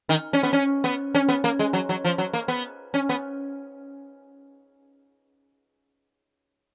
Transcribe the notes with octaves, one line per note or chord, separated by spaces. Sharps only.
D#3
C#4
B3
C#4
B3
C#4
B3
A#3
G#3
F#3
F#3
F3
F#3
A#3
B3
C#4
B3